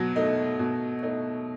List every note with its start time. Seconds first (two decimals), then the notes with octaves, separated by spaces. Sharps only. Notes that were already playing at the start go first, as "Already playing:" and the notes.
Already playing: B2 F#3
0.16 A3 D#4
0.59 B2
1.03 A3 D#4